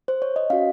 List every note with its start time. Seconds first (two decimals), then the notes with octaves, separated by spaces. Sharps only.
0.08 C5
0.22 C#5
0.36 D#5
0.50 C#4 F#4 F5